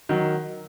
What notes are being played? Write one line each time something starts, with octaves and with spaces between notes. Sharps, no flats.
D#3 F#3